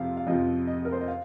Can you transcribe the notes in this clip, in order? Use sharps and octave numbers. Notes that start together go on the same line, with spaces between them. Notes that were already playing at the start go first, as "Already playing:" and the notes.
Already playing: F2 C3 F3 F5
F5
F2 C3 F3 D#5
D#5
A#4
C5
D#5
F5